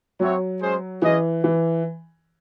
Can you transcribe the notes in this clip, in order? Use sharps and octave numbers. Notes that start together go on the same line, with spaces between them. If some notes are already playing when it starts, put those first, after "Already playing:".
F#3 C4 F#4 C#5 E5
G#3 C#4 G#4 C5
E3 C#4 G#4 D#5
E3